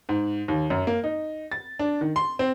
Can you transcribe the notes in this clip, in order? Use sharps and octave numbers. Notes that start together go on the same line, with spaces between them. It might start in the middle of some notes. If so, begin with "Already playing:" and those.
G#2
D#2
F#2
A#3
D#4
A6
D4
D#3
C6
C4